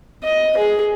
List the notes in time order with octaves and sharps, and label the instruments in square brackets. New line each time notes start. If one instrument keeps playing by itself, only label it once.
[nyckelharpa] D#5
G#4